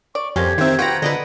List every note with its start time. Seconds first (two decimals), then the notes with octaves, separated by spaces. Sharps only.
0.15 D5 C#6
0.36 F2 A#3 C4 C#4 G4 G#6
0.58 D#3 C4 F4 E5
0.79 F4 F#4 B4 F#5 G5 A#5
1.02 D3 B4 D5 D#5